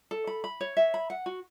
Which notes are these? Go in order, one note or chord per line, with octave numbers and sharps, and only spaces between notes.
A4
B5
B5
C#5
E5
B5
F#5
F#4